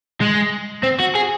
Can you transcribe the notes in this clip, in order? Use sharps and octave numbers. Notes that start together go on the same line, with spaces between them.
G#3
C4
F#4
G#4